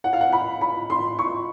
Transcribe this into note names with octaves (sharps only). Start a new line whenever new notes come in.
F#5
F5
F#5
B5
B5
C6
C#6